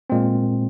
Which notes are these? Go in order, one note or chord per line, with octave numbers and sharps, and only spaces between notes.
A#2 G#3 C4